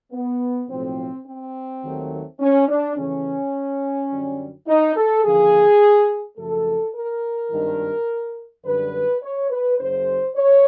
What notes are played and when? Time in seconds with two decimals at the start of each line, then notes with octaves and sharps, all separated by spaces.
0.13 B3
0.69 B1 A2 F3 C4
1.26 C4
1.83 D#2 D#3 F#3 A3
2.40 C#4
2.69 D4
2.97 E2 C#3 E3 A3 C#4
4.11 F#2 D3 G3
4.67 D#4
4.96 A4
5.24 D#2 D3 F3 A#3 G#4
6.37 F#2 C#3 F3 A3 A4
6.95 A#4
7.52 G#1 G2 D#3
8.65 F#2 D3 G3 B4
9.23 C#5
9.50 B4
9.79 F#1 F#2 C#3 C5
10.36 C#5